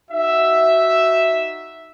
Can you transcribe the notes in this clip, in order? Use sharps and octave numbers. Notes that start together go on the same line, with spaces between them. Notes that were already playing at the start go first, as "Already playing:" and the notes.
D#4 F#4 E5